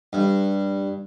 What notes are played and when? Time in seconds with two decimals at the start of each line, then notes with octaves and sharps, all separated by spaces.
0.13 G2